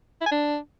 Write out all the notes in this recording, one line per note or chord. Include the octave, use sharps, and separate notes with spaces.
E4
G#5
D4